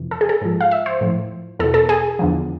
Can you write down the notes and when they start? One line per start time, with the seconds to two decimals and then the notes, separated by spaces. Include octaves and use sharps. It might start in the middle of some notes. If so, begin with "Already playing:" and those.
Already playing: F2 C3 E3
0.11 A4
0.21 G#4
0.29 A4
0.41 G#2 F3
0.61 F5
0.71 E5
0.86 C5
1.01 A2 F3
1.59 E2 B2 A4
1.74 A4
1.89 G#4
2.19 E2 D3 F3